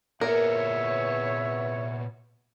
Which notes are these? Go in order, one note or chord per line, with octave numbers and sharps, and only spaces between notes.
E2 A#2 B3 A#4 C#5 E5